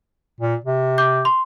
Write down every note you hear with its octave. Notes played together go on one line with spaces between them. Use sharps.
A#2
C3
D6 G6
C6